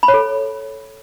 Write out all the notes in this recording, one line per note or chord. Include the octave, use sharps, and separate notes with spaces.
B5
C#5
A4